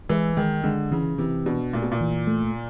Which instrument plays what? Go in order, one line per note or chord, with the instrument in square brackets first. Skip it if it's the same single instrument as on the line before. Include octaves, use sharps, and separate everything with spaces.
[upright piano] E3 [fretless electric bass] G#3
[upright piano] D#3 [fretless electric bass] G#3
[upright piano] D3 [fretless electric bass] G#3
[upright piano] C#3 [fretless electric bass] E3
[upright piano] C3 [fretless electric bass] E3
[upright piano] B2 [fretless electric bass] D4
[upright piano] A#2 [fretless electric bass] A3
[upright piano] B2
A#2
[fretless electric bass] E3
A3